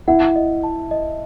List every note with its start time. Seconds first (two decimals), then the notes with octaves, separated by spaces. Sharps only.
0.08 E4 F#5
0.36 D#5
0.63 A5
0.91 D#5